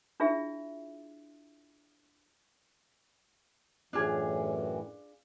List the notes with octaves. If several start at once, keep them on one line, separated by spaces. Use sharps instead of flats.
D4 E4 F4 G#4 E5
F#2 A2 E3 D4 F4 G#4